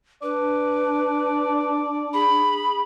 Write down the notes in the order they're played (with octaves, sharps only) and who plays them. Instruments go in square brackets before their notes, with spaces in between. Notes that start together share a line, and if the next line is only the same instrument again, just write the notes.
[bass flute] D4 [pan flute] B4 [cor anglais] D5
[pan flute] G#4 [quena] B5